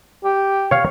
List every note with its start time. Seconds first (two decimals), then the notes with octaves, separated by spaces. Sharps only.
0.24 G4
0.71 C#5 F5